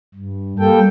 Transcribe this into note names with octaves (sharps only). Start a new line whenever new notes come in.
G2
G3 A#3 A4 G5